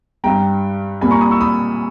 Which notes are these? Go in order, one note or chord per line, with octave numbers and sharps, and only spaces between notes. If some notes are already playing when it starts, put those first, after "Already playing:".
G2 G3 G5 A#5
A#2 G3 G#5 B5
A#5 C#6
B5 D#6
C#6 E6
B5 D#6